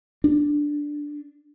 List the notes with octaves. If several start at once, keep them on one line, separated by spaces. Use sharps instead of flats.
D4